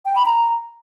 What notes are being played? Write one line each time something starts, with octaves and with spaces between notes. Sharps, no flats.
G5
B5
A#5